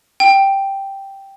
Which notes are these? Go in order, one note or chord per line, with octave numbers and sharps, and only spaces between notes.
G5